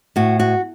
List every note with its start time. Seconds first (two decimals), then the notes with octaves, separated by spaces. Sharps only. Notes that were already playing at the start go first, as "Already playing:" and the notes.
0.16 A2 F#4
0.39 F#4